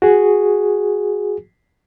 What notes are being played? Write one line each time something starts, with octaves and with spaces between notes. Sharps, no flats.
F#4 G#4